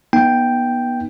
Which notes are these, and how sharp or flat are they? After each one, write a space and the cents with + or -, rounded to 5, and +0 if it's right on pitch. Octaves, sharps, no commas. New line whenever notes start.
B3 -30 D#4 -5 G5 +0